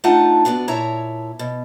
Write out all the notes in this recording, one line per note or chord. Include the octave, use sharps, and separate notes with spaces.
A3 D4 D#4 F4 F#5 A5
B2 B3 D4 F#4
A#2 E4 C#5 A5 A#5
B2